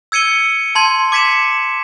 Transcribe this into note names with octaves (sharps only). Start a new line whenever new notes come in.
E6 G#6 C#7 D#7 G7
A5 C6 G#6
D6 G#6 B6 C#7 E7